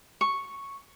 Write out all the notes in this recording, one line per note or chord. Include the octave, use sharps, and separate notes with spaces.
C#6